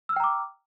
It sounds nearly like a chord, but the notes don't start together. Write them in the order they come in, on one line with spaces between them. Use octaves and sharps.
E6 F6 G5 A#5 D6